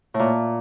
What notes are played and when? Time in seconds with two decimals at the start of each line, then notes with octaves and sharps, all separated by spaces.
0.14 A2
0.19 A#2